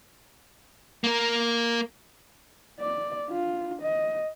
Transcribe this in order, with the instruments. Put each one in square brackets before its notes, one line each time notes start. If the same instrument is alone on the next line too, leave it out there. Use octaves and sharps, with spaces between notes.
[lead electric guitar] A#3 A#4
[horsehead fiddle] D5
D4 F4
D#5